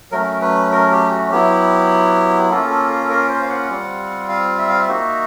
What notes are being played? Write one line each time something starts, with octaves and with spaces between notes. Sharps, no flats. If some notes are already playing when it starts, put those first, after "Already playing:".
F#3 A3 C#4 A#4
B4
A#4
G4
F#4
F#3 B3 E4 G4
A#3 C#4 F4 A4
A4
A4
A#4
C5
F5
F#5
G3 C4 F4
F5
E5
F5
E5
A#3 D#4 F#4